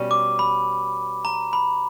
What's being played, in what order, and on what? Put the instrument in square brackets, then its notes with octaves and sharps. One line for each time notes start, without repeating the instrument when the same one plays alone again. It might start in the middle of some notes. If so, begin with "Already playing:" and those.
Already playing: [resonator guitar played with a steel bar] B2 G3 C#4
[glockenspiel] D6
B5
A#5
B5